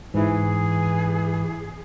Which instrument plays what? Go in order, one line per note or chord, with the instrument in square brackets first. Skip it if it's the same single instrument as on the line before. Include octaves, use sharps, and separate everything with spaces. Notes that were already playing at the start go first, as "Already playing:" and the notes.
[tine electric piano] G#2 E4 [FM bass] E3 [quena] G#4